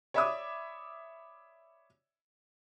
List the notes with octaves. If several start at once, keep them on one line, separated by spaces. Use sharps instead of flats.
C#5 D5 E5 B5 D6 D#6